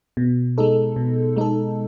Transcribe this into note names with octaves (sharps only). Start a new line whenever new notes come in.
B2
G#3 D#4 A4
B2
G#3 D#4 A4